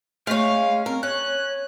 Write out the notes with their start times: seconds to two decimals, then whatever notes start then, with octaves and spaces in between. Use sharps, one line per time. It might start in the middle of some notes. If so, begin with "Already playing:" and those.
0.27 G#3 A3 C#4 F5
0.86 C4 A#4
1.03 C#4 C#5 F#6